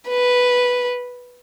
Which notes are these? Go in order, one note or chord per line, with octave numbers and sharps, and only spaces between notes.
B4